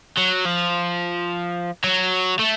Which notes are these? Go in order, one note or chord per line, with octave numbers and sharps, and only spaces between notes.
F#3
F3
F#3
A3